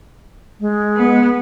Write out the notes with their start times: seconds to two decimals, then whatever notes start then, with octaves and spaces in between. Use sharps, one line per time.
0.60 G#3
0.96 B3